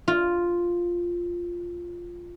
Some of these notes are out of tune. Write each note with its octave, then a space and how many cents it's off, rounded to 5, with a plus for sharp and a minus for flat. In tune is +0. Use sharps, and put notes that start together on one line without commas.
F4 +0